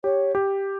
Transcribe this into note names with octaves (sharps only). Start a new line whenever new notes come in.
G4 C#5
G4